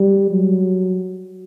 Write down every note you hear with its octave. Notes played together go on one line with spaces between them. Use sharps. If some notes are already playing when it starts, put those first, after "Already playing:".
Already playing: G3
F#3